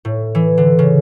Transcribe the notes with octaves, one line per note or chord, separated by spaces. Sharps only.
A2
E3
D3
C#3